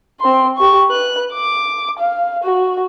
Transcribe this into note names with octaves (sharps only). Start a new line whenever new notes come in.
C4 C6
G4 C#6
B4 F#6
D6
F5
F#4